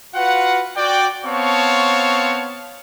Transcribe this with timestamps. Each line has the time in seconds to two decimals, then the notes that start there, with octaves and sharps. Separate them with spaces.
0.15 F4 F#4 B4 F5 F#5
0.76 F#4 D5 G5
1.25 B3 C4 C#5 F5 A5 C#6